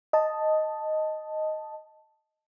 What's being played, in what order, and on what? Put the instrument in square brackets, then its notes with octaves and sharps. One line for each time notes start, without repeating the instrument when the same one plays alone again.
[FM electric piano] D#5 A5